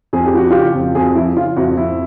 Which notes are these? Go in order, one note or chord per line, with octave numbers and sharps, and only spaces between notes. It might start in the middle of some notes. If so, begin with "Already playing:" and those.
F2 G#4
G4
F3 F#4
C#3 F4 G4
F2
F2 F#4 G#4
F3 E4
C#3 F4
F2 E4 F#4
F2 E4